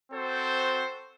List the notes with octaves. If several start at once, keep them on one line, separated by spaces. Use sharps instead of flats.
C4 F#4 A4 C5